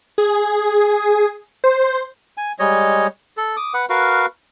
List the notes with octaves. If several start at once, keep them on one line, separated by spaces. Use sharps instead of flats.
G#4
C5
G#5
G3 G#3 C#5 D#5
A4
D6 D#6
B4 F#5
F#4 A#4 B4 F5